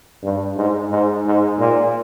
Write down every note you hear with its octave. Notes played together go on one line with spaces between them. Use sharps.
G2
G#2
G#2
G#2
A#2